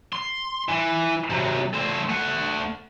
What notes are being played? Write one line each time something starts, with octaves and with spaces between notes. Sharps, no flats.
C6
E3
C3 F#3
A3 C5
A3 F#5